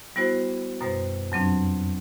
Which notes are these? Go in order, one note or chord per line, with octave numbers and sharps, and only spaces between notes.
G3 B3 E4 F#4 C5
F#2 B2 G3 C5
F2 F#3 C4 D4